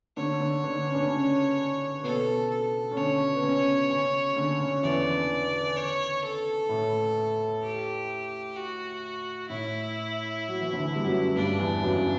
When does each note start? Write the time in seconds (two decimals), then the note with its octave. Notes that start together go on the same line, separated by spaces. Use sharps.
0.17 D3 D4 C#5
0.40 D3 D4
0.64 D3 D4
0.87 C#4
0.95 D4
1.02 C#3 C#4
2.03 B2 B3 A4
2.50 A4
2.91 C#4
2.96 D3 D4 C#5
3.35 B3
3.43 C#3 C#4
3.90 C#3 C#4
4.36 D3 D4
4.59 C#3 C#4
4.83 E2 E3 D5
5.76 C#5
6.23 A4
6.69 A2
7.63 G4
8.56 F#4
9.49 A2 E4
10.48 F#3
10.61 E3
10.73 D2 D3
10.96 G3
11.04 F#2 F#3
11.35 G2 G3 D4
11.59 E2 E3
11.82 F#2 F#3